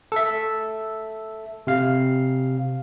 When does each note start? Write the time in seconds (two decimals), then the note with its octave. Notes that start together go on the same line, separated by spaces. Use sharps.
0.12 A4 E5
1.67 C3 F5